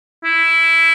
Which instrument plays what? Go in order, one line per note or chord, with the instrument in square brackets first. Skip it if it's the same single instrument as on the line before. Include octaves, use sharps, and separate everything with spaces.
[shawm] E4